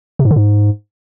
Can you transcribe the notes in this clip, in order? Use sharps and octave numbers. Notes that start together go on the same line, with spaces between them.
C3
G#2
D3
G#2